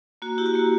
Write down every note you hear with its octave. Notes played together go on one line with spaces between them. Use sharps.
A#3 F#4
E4 G4
F#4
A#3 G4